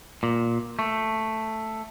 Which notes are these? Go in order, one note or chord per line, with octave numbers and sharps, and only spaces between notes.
A#2
A3